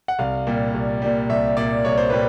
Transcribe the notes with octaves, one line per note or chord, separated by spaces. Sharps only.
F#5
C2 F5
A#2 G3
C2
A#2 G3
C2 E5
A#2 G3 D5
C2 C#5
C5
A#2 G3 B4